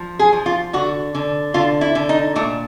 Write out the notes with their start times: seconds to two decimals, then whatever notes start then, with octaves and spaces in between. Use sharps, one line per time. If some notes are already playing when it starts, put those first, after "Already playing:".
Already playing: F3
0.19 G#4
0.33 F3
0.46 F4
0.73 D3 F#4
1.15 D3
1.54 D3 F4
1.81 E4
1.95 D3
2.09 D#4
2.36 A#2 A3